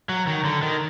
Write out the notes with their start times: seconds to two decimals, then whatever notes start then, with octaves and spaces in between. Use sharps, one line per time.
0.09 F#3
0.27 D#3
0.45 D3
0.63 D#3